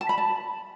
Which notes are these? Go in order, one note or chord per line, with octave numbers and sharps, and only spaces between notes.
A5
B5
A5